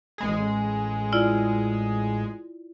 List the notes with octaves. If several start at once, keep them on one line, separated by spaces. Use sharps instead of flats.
A1 G#3 G#4
E4 F4 D5